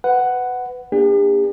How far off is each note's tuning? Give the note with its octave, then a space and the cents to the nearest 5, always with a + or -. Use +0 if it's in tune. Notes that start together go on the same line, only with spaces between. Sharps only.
B4 +20 F#5 +5
B3 -45 D4 +20 G4 +45